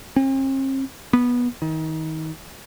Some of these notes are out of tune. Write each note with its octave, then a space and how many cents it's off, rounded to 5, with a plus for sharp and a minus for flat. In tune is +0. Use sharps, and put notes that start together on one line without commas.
C4 +45
B3 -15
D#3 +30